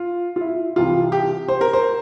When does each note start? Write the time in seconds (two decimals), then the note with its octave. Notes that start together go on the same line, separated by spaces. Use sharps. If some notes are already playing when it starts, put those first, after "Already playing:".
Already playing: F4
0.36 F4
0.41 E4
0.76 C2 C3 E3 F4
1.12 G4
1.48 C5
1.61 A#4
1.73 C5